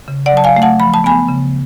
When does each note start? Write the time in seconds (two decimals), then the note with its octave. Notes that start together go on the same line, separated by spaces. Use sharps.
0.08 C#3
0.26 D5 F#5
0.32 F#3 A5
0.44 F5 G#5
0.56 A3
0.62 F#5 A5
0.80 F3 B5
0.94 A5
1.04 B3 G#5 B5
1.28 C#3